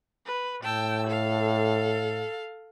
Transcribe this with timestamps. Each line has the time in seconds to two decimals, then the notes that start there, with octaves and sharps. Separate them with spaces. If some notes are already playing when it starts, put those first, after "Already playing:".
0.25 B4
0.63 A2 G5 A5 E6
1.06 A4 F5